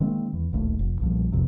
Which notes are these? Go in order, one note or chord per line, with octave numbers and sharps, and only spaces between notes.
D#3 G#3 A#3 C4
E2
D1 A#1 D#2 A3
F1
B1 A#2 F3 G3
E1 B1 F2 C3